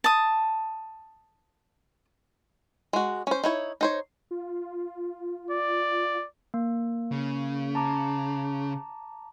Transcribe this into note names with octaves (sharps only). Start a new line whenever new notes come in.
A5 D#6
G#3 F#4
C#4 C5
D#4 E4 C#5
D#4 C5 C#5
F4
D5
A#3
C#3
A5 A#5 D6